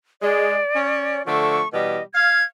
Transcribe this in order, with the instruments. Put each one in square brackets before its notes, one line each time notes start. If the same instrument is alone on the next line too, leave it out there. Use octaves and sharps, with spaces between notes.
[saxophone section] G#3 [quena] D5
[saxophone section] C#4
[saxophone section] D3 F3 A3 [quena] C#6
[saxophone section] B2 E3 G3 [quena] D#5
[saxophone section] F5 [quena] G#6